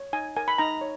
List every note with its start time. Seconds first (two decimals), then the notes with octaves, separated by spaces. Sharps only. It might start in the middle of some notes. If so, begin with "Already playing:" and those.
Already playing: C#5
0.13 D#4 G#5
0.37 A#4 G#5
0.48 B5
0.58 D#4 A#5
0.81 C#5